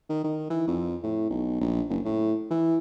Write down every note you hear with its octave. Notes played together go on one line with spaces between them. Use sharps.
D#3
D#3
E3
F2
A2
B1
A#1
F#1
A2
E3